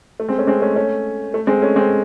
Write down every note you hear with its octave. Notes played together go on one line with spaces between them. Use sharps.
A3
G#3 C4
A3 C#4
G#3 C4
A3 C#4
A3 C#4
A3
G#3 C4
A3 C#4
G#3 C4